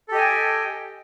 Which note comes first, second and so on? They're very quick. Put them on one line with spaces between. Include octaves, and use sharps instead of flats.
A4 G4 D#5 G#5 G5